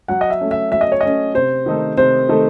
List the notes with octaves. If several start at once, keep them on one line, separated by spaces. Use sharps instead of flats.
F#3 F#5
D#5
E5
A3 C#4
E5
F#3 E5
D#5
C#5
A3 C#4 D#5
C3 C5
D#3 A3 D#4 A4
C3 C5
D#3 A3 D#4 A4